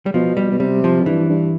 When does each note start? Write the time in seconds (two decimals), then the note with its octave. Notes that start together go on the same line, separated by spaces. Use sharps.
0.06 G3
0.14 B2 F3
0.37 G3
0.51 B2
0.60 C3 G3
0.84 F3
1.01 F2
1.06 G2 E3
1.30 G2